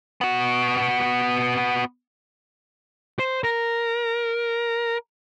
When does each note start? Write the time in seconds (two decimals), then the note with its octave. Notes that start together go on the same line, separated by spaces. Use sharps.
0.21 B3 F#4
3.19 C5
3.44 A#4